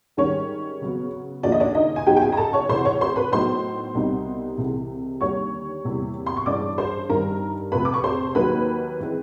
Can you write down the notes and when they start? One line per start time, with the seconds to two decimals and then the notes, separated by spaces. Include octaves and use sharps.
0.17 G#2 D#3 G3 C#4 C#5
0.81 C#3 F#3 B3
1.43 D#2 C#3 F3 A#3 D4 D5
1.52 D#5
1.60 D4 D5
1.75 D#4 D#5
1.96 G#5
2.07 C#3 F#3 B3 D#4 G4 G5
2.17 G5
2.22 G#4 G#5
2.32 A#5
2.37 A4 A5
2.53 C#5 C#6
2.69 D2 C3 E3 A3 C5 C6
2.85 C#5 C#6
3.01 C5 C6
3.16 B4 B5
3.32 A2 F#3 B3 D#4 C5 C6
3.95 C2 B2 G3 C4 D#4
4.58 C2 C3 E3 G#3 C4
5.21 D#2 D3 G3 C#5 C#6
5.84 E2 C3 E3 G3 A#3
6.26 C6
6.37 C#6
6.46 G2 E3 G#3 C#4 D5 D6
6.78 C5 C6
7.09 G2 D#3 G3 A#4 A#5
7.72 F2 C3 F3 A3 B4 B5
7.85 D6
7.94 C#6
8.04 C5 C6
8.35 D#2 D#3 F#3 A#3 B4 B5
9.00 E3 G#3 C4